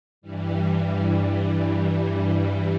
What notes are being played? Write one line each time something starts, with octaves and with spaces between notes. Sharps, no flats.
G2 E3 G3